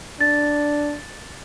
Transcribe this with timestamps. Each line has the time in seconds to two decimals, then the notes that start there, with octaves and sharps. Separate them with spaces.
0.21 D4 A6